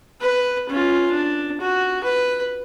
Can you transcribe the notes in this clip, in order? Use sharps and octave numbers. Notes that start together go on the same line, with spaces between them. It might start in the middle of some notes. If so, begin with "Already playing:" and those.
B4
C#4 F4
D4
F#4
B4